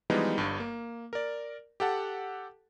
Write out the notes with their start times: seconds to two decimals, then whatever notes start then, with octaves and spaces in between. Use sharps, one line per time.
0.10 E3 F3 G3 G#3 B3 D#4
0.38 G1 G2
0.60 A#3
1.13 A#4 D5
1.80 G4 A4 F#5 A5